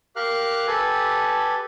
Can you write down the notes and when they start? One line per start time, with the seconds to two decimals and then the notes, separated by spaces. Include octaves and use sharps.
0.16 G4 A#4 F5 F6 F#6
0.67 G4 A4 B4 G#5